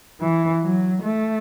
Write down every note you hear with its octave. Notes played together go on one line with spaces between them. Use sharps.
E3
F#3
A3